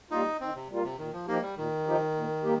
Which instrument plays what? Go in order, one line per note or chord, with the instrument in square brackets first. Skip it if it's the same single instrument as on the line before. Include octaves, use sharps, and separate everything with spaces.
[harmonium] G3 A#3 F4 [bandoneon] D#4
[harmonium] D#3 [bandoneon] C4
[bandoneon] C3
[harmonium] G3 A#3 F4
[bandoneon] C3
[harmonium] A#2 [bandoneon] D#3
[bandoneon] F3
[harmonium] F3 D#4 G4 [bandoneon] A#3
[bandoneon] G3
[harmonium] A#2 [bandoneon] D#3
[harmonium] F3 D#4 G4
A#2
G3 A#3 G4